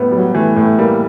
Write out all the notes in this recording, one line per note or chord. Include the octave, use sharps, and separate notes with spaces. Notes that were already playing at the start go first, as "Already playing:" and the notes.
Already playing: A2 G3 B3
F#3 G3
E3 A3
A2 A3
G3 A#3